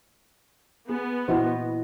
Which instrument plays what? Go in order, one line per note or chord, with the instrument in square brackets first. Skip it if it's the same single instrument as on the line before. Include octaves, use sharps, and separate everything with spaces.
[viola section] B3 [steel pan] G#4
[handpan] A#2 E3 D#5 [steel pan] E4 F#4 C5